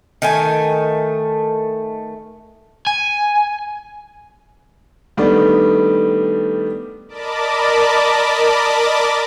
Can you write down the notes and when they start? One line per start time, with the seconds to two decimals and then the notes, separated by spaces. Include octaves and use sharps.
0.22 D#3 A3 G#5
2.87 G#5
5.17 D#3 G3 A3 B3 D4
7.08 A#4 D5 D#5 A5 B5 D6